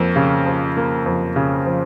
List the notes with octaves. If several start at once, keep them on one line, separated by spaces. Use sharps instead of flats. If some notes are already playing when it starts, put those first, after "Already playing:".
Already playing: F2 A#3
C#3
F3
A#3
F2
C#3
F3